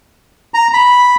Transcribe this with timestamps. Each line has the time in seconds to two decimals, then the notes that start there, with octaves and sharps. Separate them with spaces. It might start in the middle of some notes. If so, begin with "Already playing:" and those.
0.54 A#5
0.73 B5